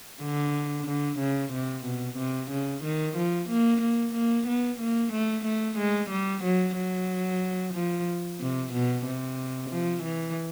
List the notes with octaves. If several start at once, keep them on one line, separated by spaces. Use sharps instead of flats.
D3
D3
C#3
C3
B2
C3
C#3
D#3
F3
A#3
A#3
A#3
B3
A#3
A3
A3
G#3
G3
F#3
F#3
F3
C3
B2
C3
F3
E3